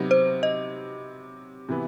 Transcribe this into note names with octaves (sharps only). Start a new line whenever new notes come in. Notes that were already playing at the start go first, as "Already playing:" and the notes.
Already playing: C3 F#3 B3 D#4
C5
D#5
C3 E3 B3